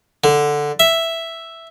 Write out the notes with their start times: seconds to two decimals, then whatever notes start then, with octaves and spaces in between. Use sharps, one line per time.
0.24 D3
0.80 E5